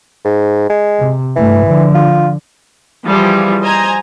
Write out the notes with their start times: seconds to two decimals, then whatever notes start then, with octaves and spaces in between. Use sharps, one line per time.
0.25 G#2
0.69 G#3
0.99 C3
1.36 G2 E3 A3
1.65 D3 F3
1.95 F4
3.06 E3 F3 G3 G#4
3.63 C5 D#5 G#5 A#5